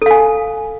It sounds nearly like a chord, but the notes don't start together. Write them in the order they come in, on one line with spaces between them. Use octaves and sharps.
A4 F5 G#5